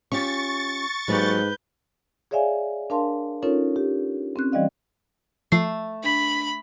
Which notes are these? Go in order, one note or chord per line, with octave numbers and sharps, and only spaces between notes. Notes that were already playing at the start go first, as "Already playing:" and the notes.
C#4 F4 G4 C#6 A6
G#2 F#3 A#3 G4 B4 G6
G#4 C#5 D5 E5 F5 G#5
D4 A#4 F5 A5 C6
C#4 D#4 F4 A4 A#4 C#5
G4
C4 C#4 F#6
E3 G3 D5 D#5 F5
F3 A3 C7
D4 B5 B6 F#7